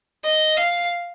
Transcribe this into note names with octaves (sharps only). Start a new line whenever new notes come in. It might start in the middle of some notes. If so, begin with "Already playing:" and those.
D#5
F5